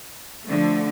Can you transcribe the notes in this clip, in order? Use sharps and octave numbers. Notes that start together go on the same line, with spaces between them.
D3 F3 A3